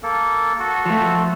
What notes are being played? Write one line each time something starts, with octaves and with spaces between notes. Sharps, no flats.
A#3 A4
F#4 A4
F3 A3